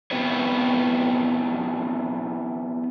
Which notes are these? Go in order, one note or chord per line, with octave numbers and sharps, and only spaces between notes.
B3 C4 E4 G4 B4 C#5